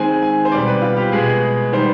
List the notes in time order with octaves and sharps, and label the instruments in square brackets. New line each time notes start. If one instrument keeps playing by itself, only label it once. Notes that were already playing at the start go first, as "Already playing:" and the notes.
Already playing: [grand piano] D#3 G#3 C4 G#5
G#5
C5
B2 G3 C4 D5
B4
F4
G4
B2 G#3 B3 G#4
D#3 G3 B3 C5